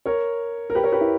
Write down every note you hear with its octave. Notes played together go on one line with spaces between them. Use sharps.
A#4 C#5
A#4
G4 B4
A#4 C#5
G4 B4
E4